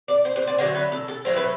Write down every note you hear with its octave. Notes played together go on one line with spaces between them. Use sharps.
D5
C5
C5
D5
D3 F#3 A3 C5
B4
A4
A4
A2 F#3 A3 C5
B4